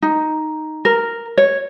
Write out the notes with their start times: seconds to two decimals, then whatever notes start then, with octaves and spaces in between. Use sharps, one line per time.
0.02 D#4
0.85 A#4
1.37 C#5